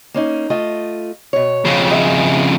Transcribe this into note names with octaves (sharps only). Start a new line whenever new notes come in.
A#3 C#4 D#4
A3 F4 D#5
B2 C#5
F2 C#3
G#4 D#5 E5